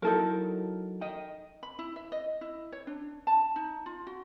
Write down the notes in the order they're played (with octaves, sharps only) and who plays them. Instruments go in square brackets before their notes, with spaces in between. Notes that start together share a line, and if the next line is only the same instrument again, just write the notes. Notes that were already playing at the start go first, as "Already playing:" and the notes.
[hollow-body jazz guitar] F#3 E4 [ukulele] D#4 A4 A#4
[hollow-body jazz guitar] D#5 G5
[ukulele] B5
E4
E5
D#5
E4
C#5
D4
A5
D#4
F4
F#4